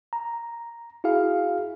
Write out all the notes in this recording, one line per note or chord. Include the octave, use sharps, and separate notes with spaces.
A#5
E4 F#4 G#4 F5